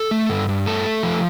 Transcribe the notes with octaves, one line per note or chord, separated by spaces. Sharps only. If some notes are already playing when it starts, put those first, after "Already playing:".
Already playing: A4
A3
G2
G2
A3 A4
A3
F3